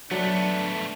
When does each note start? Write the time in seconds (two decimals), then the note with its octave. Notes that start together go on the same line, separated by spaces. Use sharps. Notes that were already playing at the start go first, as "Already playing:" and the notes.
0.11 F#3 A3 B3 D4